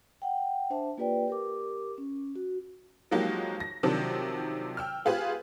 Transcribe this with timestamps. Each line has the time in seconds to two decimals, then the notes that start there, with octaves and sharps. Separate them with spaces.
0.22 F#5 G5
0.70 D4 C5 E5 A5
0.98 A#3 F4 G4 B4 D5 G5
1.28 G4 A#4 D6
1.98 C#4
2.36 F#4
3.11 F3 F#3 G#3 A#3 D#4 G4
3.60 A#6
3.83 C3 D#3 F3 F#3 C4 D4
4.77 G5 E6 F6
5.05 B3 F4 G4 G#4 B4 C5